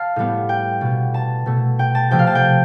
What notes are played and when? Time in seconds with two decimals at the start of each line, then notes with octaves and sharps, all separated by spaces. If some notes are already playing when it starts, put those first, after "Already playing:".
Already playing: F5 A5
0.16 A2 G3 B3
0.49 G5
0.81 B2 B3
1.14 A5
1.46 B2 A3
1.79 G5
1.95 A5
2.11 C3 F3 A3 G5
2.19 F5
2.27 A5
2.35 G5